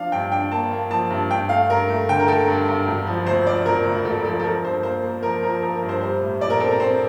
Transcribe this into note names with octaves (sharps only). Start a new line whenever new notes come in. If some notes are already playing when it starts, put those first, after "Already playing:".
Already playing: F3 D4 F5
G2 G5
D4 G5
A#3 A5
A#3
F3 A5
G2
G2 G5
A3 F5
G2 A#4
A3
D3 G5
A#4
A3 A4
G2
G2
E1
F3
D2 C5
F3 D5
E1 A#4
D2
E1 A4
F3 A4
A4
F3 A#4
G2 C5
A#3 C5
A#3
F3 A#4
F3 A#4
F3 A#4
A#4
G2
C5
G3 C5
A2
A#1 D5
A#4
C4 A4
A#4
C4 C5